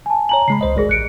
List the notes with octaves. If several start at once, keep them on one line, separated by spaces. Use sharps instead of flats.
G#5 A5
C#5 G#5 A#5 F#7
C#3 G#3 B5 C7
C#2 C5 D#5
G#1 G#3 G#4 A#4 D5 A#6
A1 F#6 C#7 D7